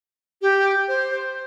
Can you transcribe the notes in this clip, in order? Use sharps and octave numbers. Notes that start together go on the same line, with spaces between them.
G4
C5